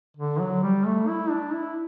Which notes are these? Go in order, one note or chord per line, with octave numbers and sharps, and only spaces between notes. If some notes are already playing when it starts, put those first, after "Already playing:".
D3
F#3
G3
A3
E4
D4
E4